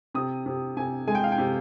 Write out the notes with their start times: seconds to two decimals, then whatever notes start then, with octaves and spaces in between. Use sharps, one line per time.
0.14 C3 D#6
0.46 C3
0.77 C3 G#5
1.07 G#3 G#5
1.15 G5
1.24 F5
1.32 G5
1.38 C3